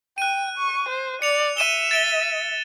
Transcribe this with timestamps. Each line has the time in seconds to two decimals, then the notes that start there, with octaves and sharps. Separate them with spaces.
0.18 G5 F#6 D#7
0.58 C#6
0.89 C5
1.22 D5 C#7 F7
1.57 E5 D#7 E7 G7
1.91 A6 D7 G7